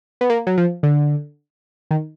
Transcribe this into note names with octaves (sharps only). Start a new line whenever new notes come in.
B3
A#3
F#3
F3
D3
D#3